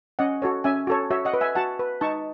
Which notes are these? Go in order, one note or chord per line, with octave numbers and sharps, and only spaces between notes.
C#4 D#5 F#5
F#4 A4 C#5
C#4 E5 G#5
F#4 A4 C#5
F#4 C#5 E5
D#5 F#5
B4
E5 G#5
F#4 F#5 A5
B4
D#4 A5 C#6